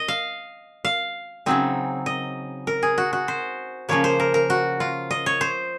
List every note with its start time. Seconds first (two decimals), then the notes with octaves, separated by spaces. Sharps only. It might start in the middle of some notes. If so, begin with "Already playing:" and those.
Already playing: D#5
0.08 F5
0.85 F5
1.46 C#3 F#3 C4 D#4
2.06 D#5
2.67 A#4
2.83 G#4
2.98 F#4
3.13 F#4
3.28 C5
3.89 C#3 F3 A#3 C#5
4.04 C5
4.20 A#4
4.34 A#4
4.50 F#4
4.80 F4
5.11 D#5
5.26 C#5
5.41 C5